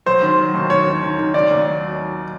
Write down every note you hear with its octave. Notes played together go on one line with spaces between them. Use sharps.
F#3 C5
D#3
F#3
D#2
D#3 C#5
D#3
D#3
D#3
D#3 D5
D#2
F#3